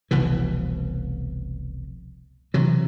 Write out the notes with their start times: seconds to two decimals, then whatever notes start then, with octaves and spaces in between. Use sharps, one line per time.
0.11 F1 C2 B2 E3
2.54 C3 E3 F#3